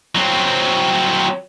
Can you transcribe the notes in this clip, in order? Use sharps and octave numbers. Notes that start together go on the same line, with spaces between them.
F#3 C4